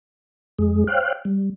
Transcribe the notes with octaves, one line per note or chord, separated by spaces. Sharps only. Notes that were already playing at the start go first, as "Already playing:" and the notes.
F2 G#3 G#4
C5 C#5 F5 G5 F6 F#6
G3